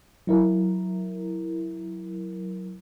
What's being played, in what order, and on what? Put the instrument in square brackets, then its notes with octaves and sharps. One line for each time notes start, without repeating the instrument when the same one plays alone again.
[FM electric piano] F#3 E4 A#4